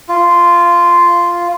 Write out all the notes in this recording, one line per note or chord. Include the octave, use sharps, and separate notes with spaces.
F4